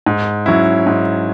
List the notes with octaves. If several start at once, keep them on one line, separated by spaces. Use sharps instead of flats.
G#2
F#3 C#4 E4
G#2